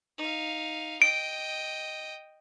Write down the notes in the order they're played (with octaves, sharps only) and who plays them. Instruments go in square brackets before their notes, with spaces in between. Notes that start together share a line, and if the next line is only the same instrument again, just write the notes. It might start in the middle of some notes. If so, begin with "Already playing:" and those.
[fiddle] D#4 F5
[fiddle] D#5 G5 [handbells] D7